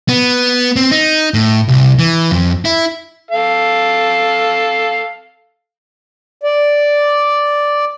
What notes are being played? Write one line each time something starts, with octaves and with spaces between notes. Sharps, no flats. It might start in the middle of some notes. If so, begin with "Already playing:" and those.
B3
C4
D#4
A2
C2
E3
F2
E4
A4 F5
D5